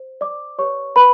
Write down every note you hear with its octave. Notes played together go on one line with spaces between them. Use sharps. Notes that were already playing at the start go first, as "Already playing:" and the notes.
Already playing: C5
D5 D6
G4 B4 C#5 D5 C#6
B4 B5